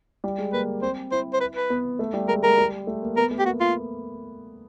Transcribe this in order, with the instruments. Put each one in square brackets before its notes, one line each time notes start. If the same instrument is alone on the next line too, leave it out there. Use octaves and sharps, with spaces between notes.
[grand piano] G3
G#3
[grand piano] A#3 [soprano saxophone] B4
[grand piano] C4 [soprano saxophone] C5
[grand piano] E4 [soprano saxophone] C5
[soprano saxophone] C5
B4
B4
[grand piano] B3
A3
G3
[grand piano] G#3 [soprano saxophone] A#4
[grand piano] G#3 [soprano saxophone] A#4
[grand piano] G3
A3
A#3
[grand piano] B3 [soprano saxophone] A#4
[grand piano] A3
[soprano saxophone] G4
[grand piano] A#3 [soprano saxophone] F#4
[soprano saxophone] F4